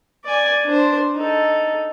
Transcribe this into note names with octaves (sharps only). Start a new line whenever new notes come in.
D5 G#5
D4 C5
D#4 A4